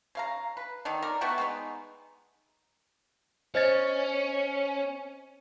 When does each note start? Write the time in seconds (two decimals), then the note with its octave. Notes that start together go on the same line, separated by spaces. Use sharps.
0.15 C#3 F5 A#5
0.57 B4
0.85 D3 D#3 D#4
1.02 A#4 D5
1.21 A3 B3 F#4 G5
1.38 G#3 B3 D#4
3.55 C#4 C5 D#5 A6